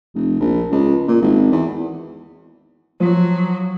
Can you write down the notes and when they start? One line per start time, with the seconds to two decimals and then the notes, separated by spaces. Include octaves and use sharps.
0.15 F1
0.40 A#1
0.71 C#2
1.08 A#2
1.22 G#1
1.52 E2
3.00 F3 F#3